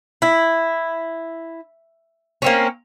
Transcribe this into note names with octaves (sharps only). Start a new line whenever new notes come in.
E4
A#3 C4 C#4